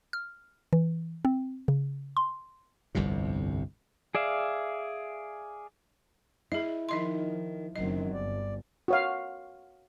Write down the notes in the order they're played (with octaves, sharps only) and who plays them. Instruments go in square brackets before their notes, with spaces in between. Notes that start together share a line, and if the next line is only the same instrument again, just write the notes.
[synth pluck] F6
E3
C4
C#3
C6
[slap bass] G1 C2 F2 C3
[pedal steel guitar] G#4 D5 E5 F5
[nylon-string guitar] E4 [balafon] G#4 D#5
[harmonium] D#3 [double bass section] F3 [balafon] D#4 D#5 C6
[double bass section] F#1 F#3 C4 [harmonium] F#2 D#3 [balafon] D#5
[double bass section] G1 [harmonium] D5
[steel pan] F#4 C#5 F5